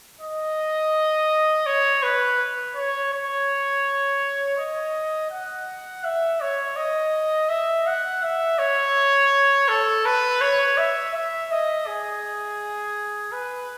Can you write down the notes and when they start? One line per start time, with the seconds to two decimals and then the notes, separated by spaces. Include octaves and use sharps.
0.21 D#5
1.66 C#5
2.03 B4
2.76 C#5
3.13 C#5
4.58 D#5
5.31 F#5
6.04 E5
6.41 C#5
6.76 D#5
7.49 E5
7.86 F#5
8.22 E5
8.59 C#5
9.68 A4
10.05 B4
10.41 C#5
10.78 E5
11.14 E5
11.51 D#5
11.87 G#4
13.32 B4